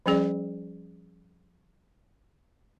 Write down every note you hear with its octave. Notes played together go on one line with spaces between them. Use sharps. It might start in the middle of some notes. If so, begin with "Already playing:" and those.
F3 G3 C#4 G#4 D5